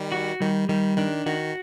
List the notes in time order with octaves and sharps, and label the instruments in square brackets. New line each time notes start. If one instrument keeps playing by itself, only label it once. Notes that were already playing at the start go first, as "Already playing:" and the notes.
Already playing: [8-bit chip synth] D#3 G3
[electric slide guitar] F#4
[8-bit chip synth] D#3 [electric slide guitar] G3
[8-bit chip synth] D#3 [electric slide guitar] G3
[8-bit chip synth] D#3 [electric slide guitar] D4
[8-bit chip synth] D#3 [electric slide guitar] F#4